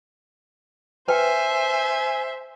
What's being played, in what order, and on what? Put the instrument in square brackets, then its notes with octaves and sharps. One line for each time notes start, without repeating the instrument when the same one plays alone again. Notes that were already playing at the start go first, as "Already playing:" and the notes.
[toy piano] B4 G5 [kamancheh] C5 E5 [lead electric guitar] G#5